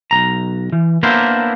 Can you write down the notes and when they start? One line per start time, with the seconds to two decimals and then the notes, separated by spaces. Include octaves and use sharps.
0.11 B1 F#2 A#5
0.72 E3
1.03 A#3 B3 D4 E4 A#4 C5